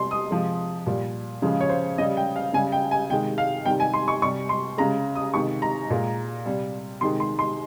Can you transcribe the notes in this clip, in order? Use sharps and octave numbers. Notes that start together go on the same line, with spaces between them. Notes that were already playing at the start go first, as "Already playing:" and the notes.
Already playing: C3 G3 C6
D#6
C3 F3 G#3
A#2 G3
C#3 F3 G#3
C#5
C5
C#3 G3 D#5
G5
F5
C#3 G3 G#5
G5
G#5
C3 D#3 G#3 G5
F5
C3 D#3 G3 G5
G#5
C6
C#6
C3 G3 C#6
C6
C#3 G#3 A#5
D#6
C3 D#3 G#3 C#6
A#5
A#2 G#3
C3 G3
C3 D#3 G#3 C6
C6
C6